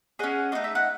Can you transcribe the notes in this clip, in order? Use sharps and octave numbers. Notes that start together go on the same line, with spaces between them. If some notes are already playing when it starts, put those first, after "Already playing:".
C#4 G#4 D#5 F#5
A3 D#4 F#4 D#5
E5
F#5